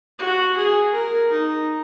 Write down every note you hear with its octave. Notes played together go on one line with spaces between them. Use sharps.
F#4
G#4
A#4
D#4